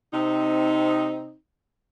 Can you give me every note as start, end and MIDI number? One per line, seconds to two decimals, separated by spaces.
0.13 1.34 48
0.13 1.34 60
0.13 1.34 63